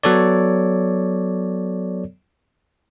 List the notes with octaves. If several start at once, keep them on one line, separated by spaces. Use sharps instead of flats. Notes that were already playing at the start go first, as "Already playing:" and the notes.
F#3 B3 A4 C#5 D5